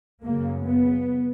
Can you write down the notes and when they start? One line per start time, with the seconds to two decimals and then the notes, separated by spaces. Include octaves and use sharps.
0.24 F#2 C#3 A#3
0.65 B3